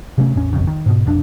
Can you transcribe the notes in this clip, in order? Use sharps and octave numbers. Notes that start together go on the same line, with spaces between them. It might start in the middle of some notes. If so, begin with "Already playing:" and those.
C3 F#3 A3 C#4
A1 E2 C#4
F#1 B1 F2 C#3
D#3
G#2 B2
F1 B1 F2 D4